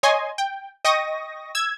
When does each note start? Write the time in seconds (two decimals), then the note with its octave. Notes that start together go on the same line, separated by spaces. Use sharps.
0.03 C#5 D#5 G#5 C6
0.38 G5
0.85 D#5 G5 C#6 D#6 A#6
1.55 E6 G#6